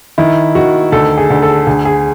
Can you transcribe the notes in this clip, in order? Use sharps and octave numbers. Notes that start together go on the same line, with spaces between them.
D#3 E4
D#3 F#4
D2 A4
G#4
D2
A4
D2 G#4
G#4